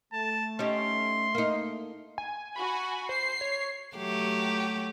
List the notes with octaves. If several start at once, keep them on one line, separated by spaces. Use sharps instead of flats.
A3 A5
C#4 D#4 G4 C6
A#3 D#4
G#5
F#4 G#5 B5
C5 C7
C#5
F#3 A3 G4